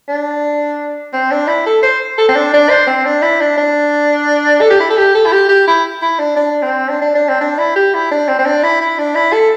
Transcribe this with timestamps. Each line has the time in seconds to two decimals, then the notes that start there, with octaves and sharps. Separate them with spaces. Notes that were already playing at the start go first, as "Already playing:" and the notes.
0.09 D4
1.13 C4
1.31 D4
1.47 E4
1.66 A4
1.83 C5
2.18 A4
2.28 C4
2.36 D4
2.53 D4
2.70 C5
2.87 C4
3.05 D4
3.22 E4
3.40 D4
3.57 D4
4.61 A4
4.70 G4
4.80 E4
4.90 A4
4.97 G4
5.15 A4
5.26 E4
5.32 G4
5.49 G4
5.67 E4
6.02 E4
6.19 D4
6.36 D4
6.62 C4
6.88 D4
7.02 D4
7.15 D4
7.29 C4
7.41 D4
7.58 E4
7.75 G4
7.94 E4
8.11 D4
8.28 C4
8.39 C4
8.45 D4
8.63 E4
8.81 E4
8.98 D4
9.15 E4
9.33 A4